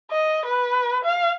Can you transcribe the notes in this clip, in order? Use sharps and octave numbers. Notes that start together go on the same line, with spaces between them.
D#5
B4
F5